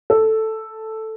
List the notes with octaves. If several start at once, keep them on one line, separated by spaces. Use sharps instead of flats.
A4